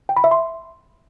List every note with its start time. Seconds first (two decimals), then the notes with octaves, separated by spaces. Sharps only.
0.09 G5
0.17 B5
0.24 E5
0.31 C6